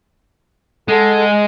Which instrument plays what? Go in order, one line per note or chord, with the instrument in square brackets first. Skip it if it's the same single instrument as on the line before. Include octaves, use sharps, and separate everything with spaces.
[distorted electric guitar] G#3 [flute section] G#4 A4 F#5